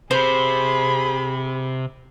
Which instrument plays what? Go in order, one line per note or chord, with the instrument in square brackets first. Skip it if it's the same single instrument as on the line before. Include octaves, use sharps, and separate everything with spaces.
[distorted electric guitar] C3 [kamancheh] G#4 B5 [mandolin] C5